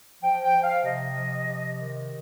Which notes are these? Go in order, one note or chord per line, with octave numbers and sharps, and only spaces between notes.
F3 G5
G5
F3
F5
C3 D#5
F3
C3
D#3